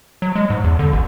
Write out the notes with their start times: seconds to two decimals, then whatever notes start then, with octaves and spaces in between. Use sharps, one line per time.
0.22 F#3
0.36 G#3
0.50 G#2
0.64 E2
0.79 D3
0.93 A1